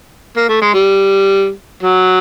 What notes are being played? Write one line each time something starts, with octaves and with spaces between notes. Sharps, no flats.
A#3
A3
G#3
G3
F#3